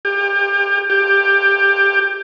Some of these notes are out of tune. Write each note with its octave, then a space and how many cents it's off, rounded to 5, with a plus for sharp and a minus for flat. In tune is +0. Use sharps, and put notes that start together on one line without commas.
G4 +30
G4 +15